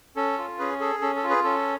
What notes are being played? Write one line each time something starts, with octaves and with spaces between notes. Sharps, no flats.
C#4 A4
F4
C#4 G#4 B4
G#4 A4
C#4 A4
A4
F4
G#4 B4
C#4 A4